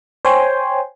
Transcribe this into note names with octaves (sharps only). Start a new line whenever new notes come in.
C5 C#5 G5 G#5 C6